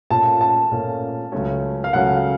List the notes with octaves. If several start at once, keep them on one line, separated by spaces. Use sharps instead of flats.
A#2 A3 C#4 F4 A5
A5
A#2 A3 C#4 F4
C#2 C#3 F#3 A3 C#4
F5
C#2 C#3 F#3 A3 C#4 F#5